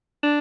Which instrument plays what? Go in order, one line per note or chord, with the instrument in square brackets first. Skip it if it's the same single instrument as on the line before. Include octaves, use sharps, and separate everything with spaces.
[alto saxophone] D4